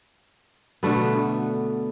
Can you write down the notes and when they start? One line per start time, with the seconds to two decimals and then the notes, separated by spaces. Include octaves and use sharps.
0.83 B2 D3 A3 B3